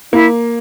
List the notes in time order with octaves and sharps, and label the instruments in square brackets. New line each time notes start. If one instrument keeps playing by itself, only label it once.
[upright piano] A#3 [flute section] E4